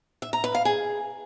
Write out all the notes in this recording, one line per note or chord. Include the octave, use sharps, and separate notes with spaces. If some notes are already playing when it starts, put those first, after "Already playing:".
E5
A#5
B4
F5
G#4